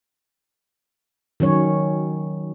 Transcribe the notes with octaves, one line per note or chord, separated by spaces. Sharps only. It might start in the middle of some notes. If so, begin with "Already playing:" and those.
D#3 F#3 C#4 C#5